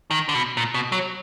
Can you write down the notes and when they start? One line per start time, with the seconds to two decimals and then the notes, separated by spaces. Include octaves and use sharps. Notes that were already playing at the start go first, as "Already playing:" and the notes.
0.11 D#3
0.29 D3
0.34 B2
0.57 A#2
0.74 B2
0.92 F#3